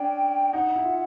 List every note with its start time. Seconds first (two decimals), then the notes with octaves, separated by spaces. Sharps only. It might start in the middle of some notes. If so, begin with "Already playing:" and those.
Already playing: C#4 D4 G5
0.53 D#4 F#5
0.76 E4
0.84 F4